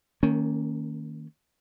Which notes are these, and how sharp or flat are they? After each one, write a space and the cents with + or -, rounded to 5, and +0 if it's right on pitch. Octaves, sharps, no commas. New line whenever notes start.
D#3 +10 A#3 -25 C#4 +0